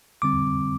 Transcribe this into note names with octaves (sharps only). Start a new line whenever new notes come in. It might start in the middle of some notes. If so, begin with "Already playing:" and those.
D3 G3 C4 D6